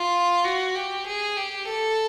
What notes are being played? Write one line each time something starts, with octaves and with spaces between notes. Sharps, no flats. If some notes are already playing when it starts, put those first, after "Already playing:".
Already playing: F4
F#4
G4
G#4
G4
A4